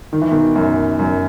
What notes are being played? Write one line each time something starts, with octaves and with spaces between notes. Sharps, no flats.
D#3
E3
B2 D#3
F#2
F#2